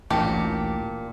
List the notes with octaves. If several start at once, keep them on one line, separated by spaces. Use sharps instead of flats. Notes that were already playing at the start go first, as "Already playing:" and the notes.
A1 D2 A#2 G4 A5 C#7